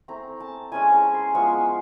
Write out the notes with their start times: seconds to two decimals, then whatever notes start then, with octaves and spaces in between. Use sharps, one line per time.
0.08 A3 C4 E4 A#5
0.40 A5
0.72 G#3 C#4 E4 G#5
0.93 A#5
1.14 C6
1.34 F3 G#3 B3 E4 C#6
1.66 C6